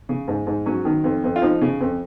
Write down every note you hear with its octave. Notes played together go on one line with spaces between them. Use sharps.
C#3
G#2
G#2
F#3 C#4
D#3
F2
F2
F4
F3 D#4
C#3
F2